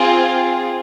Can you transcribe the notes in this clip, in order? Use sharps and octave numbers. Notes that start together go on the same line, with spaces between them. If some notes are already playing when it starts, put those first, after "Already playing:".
Already playing: C4 F4 G#4